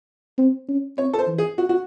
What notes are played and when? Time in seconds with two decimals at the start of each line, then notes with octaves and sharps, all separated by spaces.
0.38 C4
0.69 C#4
0.98 C4 C#5
1.13 A4
1.19 C5
1.28 E3
1.38 G#4
1.58 F#4
1.69 F#4